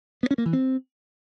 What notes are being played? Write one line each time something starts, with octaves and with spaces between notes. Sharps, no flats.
B3
C#4
A#3
E3
C4